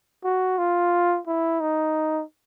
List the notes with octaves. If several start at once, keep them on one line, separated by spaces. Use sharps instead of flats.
F#4
F4
E4
D#4